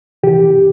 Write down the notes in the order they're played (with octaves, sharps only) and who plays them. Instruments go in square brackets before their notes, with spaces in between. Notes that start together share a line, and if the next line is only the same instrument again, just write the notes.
[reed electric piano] C3 E3 G4